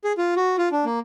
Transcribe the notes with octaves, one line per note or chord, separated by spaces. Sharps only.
G#4
F4
F#4
F4
D4
A#3